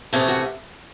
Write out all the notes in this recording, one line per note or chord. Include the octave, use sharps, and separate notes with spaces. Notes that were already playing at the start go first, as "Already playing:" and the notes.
C3 E3 A3 C#4 G#4
F#4